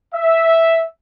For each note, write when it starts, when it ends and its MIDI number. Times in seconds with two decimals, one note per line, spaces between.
0.15 0.85 76